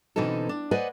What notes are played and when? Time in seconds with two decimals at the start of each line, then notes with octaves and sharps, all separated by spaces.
0.16 B2 D3 E3 C4 D#4 A4
0.49 D4
0.71 B4 C5 D5 D#5 F#5 G#5